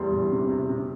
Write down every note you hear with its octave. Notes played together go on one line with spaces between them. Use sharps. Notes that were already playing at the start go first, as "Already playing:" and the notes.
Already playing: E2 G3 C6
E2
C3
C3
C3